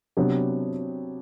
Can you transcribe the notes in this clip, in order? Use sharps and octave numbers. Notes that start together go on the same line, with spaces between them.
C3 F#3 B3 D4 G4